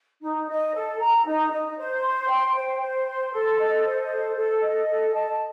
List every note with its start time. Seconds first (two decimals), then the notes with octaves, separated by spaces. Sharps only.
0.22 D#4
0.49 D#5
0.74 A4
1.00 A#5
1.25 D#4
1.51 D#5
1.77 C5
2.02 C6
2.29 G5
2.55 C5
2.80 C5
3.06 C6
3.32 A4
3.58 D#5
3.83 C5
4.10 A4
4.36 A4
4.62 D#5
4.88 A4
5.13 A5